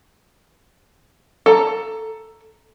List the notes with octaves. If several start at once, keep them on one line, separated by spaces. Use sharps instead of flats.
A4 A#5